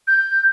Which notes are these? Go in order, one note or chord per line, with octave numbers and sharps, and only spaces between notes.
G6